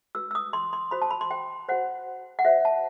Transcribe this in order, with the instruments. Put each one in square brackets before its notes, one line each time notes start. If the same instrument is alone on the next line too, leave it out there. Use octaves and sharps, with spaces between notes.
[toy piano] F#4 B4 E6
E6
D#6
C6
C6
F#4 C5 B5
A5
B5
C6
G5
F#4 C5 F#5
F#5
F#4 C5 E5
A5